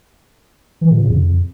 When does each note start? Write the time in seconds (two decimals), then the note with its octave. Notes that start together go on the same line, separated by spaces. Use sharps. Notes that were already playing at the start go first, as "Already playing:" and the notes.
0.81 E3
0.90 A#2
0.99 C#3
1.09 F2